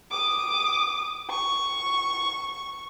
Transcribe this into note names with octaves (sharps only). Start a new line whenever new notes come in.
D6 D#6
C#6